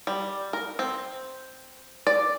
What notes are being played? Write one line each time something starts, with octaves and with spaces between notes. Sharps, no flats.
G3
A#4
C4
D5